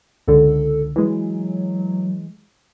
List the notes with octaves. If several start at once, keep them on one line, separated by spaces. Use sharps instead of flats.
C#2 D3 A4
E3 F#3 G#3